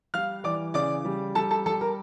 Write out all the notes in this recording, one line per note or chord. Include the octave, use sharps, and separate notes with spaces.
G3 F5 F6
E3 D5 D6
C#3 D5 D6
G3
G3 A4 A5
A4 A5
G3 A4 A5
A#4 A#5